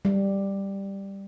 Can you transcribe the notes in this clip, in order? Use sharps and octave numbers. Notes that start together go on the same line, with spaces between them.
G3